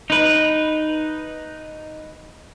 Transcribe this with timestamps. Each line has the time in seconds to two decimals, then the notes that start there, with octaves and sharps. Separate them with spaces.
0.10 D#4 B4